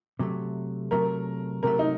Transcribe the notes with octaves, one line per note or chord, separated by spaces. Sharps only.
C3 F#3 A3
C3 F#3 A3 A#4
C3 F#3 A3 A#4
D#4